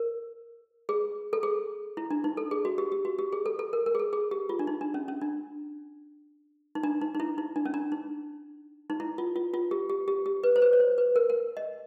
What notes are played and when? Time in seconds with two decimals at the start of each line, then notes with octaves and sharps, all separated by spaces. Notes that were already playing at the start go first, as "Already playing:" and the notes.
Already playing: A#4
0.89 G#4
1.33 A4
1.43 G#4
1.97 E4
2.11 D4
2.24 D#4
2.37 A4
2.51 G#4
2.65 F#4
2.78 G4
2.92 G4
3.05 F#4
3.19 G4
3.33 G#4
3.46 A4
3.59 A4
3.73 A#4
3.86 A#4
3.95 G#4
3.99 A4
4.13 G#4
4.31 G4
4.49 F4
4.59 D4
4.67 D#4
4.81 D4
4.94 C#4
5.08 C#4
5.21 D4
6.75 D#4
6.83 D4
7.01 D#4
7.15 D#4
7.20 E4
7.38 D#4
7.56 D4
7.66 C#4
7.74 D4
7.92 D#4
8.90 D#4
9.00 E4
9.18 F4
9.36 F4
9.54 F4
9.71 G4
9.90 G4
10.08 G4
10.26 G4
10.44 B4
10.56 C5
10.62 B4
10.73 C#5
10.80 C5
10.98 B4
11.16 A#4
11.30 A#4
11.57 D#5